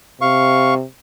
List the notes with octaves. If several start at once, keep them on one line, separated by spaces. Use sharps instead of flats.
C3 F5 C#6